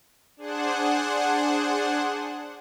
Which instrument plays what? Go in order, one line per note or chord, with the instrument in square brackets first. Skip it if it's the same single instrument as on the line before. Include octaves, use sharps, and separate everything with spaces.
[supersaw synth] D4 G#4 C5 F#5